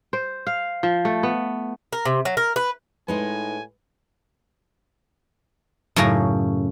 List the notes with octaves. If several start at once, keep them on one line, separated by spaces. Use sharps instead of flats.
C5
F5
F3
A3
B3
A#4
C3
F#3
A#4
B4
A2 G#3 D#4 B4 C5 G#5
F#2 A2 C#3 A#5